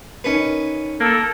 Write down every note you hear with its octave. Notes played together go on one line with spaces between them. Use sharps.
C#4 D#4 A#4 B4
A#3 A4